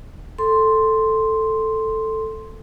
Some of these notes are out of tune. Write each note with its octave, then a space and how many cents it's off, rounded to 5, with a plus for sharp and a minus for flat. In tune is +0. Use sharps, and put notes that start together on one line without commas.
A4 +0 C6 +0